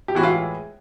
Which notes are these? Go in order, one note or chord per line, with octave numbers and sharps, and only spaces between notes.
G4
A2 E3 G#3 F#4
F4